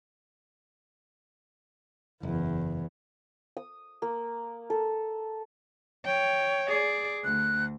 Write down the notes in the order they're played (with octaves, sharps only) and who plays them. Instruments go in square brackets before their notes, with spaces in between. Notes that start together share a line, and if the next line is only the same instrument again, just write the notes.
[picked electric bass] F#1 [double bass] E2
[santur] D#6
A#3
A4
[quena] C#5 [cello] G5
[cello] G#4 D5
[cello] D2 [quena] F#6